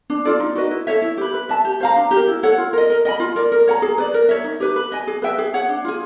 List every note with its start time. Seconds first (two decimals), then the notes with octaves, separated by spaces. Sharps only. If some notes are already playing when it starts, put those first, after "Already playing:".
0.10 D4
0.25 F4 A4 D5
0.40 D#4
0.55 F#4 B4 D#5
0.71 E4
0.87 A4 C#5 E5
1.02 E4
1.18 G4 B4
1.34 B4
1.49 E5 A5
1.65 G4
1.80 C5 F5 A#5
1.96 D4
2.11 G4
2.16 A#4
2.28 E4
2.43 A4 C#5 F#5
2.58 F4
2.73 A#4 D#5
2.90 A#4
3.05 D#5 G5 B5
3.20 F4
3.36 A#4 D5
3.52 A#4
3.67 C#5 F#5 A#5
3.82 G#4
3.98 B4 D5
4.14 A#4
4.29 C#5 E5
4.44 D#4
4.60 G4 B4
4.76 B4
4.92 D#5 G#5
5.07 G#4
5.22 B4 E5 G5
5.38 G#4
5.54 C#5 F#5
5.69 D4
5.85 F4 G#4